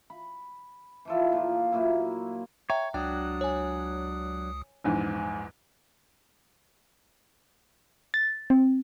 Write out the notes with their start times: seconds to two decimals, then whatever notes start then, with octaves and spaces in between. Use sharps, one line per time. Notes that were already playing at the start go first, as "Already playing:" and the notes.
0.10 B5
1.05 E3 F3 A4
1.33 A#2 F3 A#3
1.72 A#2 F#3 A#3 E4
2.70 C#5 E5 G5 A#5
2.94 C#2 F#3 D4 G5 D#6
3.41 C#5 G#5
4.84 A#1 E2 G#2
8.14 A6
8.50 C4